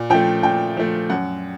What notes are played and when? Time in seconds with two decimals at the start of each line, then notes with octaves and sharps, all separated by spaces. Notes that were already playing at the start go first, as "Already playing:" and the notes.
Already playing: A#2
0.10 F3 A3 G5
0.43 A#2 G5
0.77 F3 A3
1.10 F#2 F#5